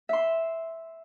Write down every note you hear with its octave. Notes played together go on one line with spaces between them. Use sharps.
E5 C6